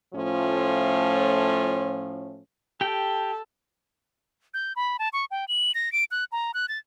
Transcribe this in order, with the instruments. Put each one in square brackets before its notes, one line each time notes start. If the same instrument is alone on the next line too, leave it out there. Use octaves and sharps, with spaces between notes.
[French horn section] A2 F3 A3 C#4 F4
[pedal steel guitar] G4 G5 [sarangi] A4
[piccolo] G6
B5
A5
C#6
G5
F#7
A#6
D7
F#6
A#5
F#6
A6